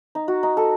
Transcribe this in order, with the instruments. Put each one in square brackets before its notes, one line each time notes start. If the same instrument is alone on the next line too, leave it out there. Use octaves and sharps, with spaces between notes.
[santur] D#4
F#4
D#4
A4